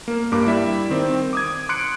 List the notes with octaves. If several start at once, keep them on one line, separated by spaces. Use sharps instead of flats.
A#3
G2 A#3 D6
G3 E4 D5 E5
D#3 C4
D6 D#6 G#6
C6 F#6 C#7 D7